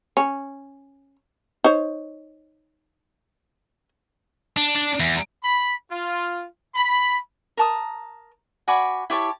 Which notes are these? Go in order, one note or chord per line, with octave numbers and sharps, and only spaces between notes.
C#4
D#4 C5 C#5
D4
D4
E2
B5
F4
B5
A#4 A5 D#6
F#4 D5 G#5 B5
E4 G4 C#5 A5